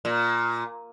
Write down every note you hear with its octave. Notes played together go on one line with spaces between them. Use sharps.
A#2